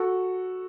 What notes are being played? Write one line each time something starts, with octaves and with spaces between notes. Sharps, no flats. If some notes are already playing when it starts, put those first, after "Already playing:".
Already playing: F#4 A4